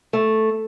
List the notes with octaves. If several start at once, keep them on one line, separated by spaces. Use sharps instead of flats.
A3